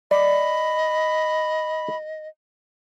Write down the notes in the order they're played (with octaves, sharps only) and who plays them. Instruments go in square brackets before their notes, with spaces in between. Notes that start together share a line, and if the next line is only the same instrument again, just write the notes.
[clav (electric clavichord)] D5 [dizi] D#5 [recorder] B5